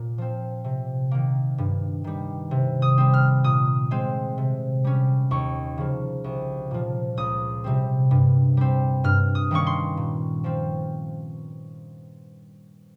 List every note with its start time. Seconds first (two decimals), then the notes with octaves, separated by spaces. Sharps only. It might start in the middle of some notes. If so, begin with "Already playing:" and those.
Already playing: A#2
0.18 F3 C4
0.64 C3
1.11 D#3 A#3
1.58 G2
2.04 D#3 G3
2.51 C3
2.82 D#6
2.98 G3 C4
3.14 F6
3.44 A#2 D#6
3.91 G#3 C4
4.38 C3
4.84 G3 C#4
5.31 D#2 C#6
5.78 C#3 F3
6.24 C2
6.71 A#2 F3
7.17 C#2 D#6
7.64 C3 G3 C4
8.11 G2
8.57 G3 C4
9.04 G2 F6
9.35 D#6
9.51 D#3 G3 A#3 C#4 C#6
9.67 C6
9.97 A#2
10.44 F3 C4